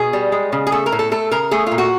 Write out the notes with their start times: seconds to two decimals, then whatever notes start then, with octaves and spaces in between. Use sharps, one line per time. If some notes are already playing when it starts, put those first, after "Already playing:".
Already playing: B2 G#4
0.13 G3
0.32 G#3
0.53 C#3
0.67 G#4
0.72 A3 A4
0.86 A#4
0.92 A2
0.99 A4
1.12 A3 A4
1.31 C#3 A#4
1.51 A3 G#4
1.67 A#2 F4
1.78 F#4